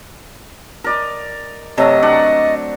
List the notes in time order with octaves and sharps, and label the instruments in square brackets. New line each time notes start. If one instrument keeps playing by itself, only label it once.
[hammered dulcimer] A#4 D5 D#5
[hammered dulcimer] C3 F#3 A3 [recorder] D#5
[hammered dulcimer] D4 D5 F#5